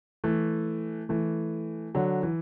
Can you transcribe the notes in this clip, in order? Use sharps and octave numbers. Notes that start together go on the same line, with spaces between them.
E3 A3
E3 A3
D3 F#3
E3